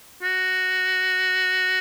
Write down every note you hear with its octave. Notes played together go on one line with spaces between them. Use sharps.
F#4